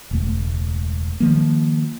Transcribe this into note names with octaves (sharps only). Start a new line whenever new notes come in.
E1 C#2 A3
D#3 F3 A#3